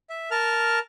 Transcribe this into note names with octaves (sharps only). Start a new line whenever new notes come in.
E5
A#4 A5 F6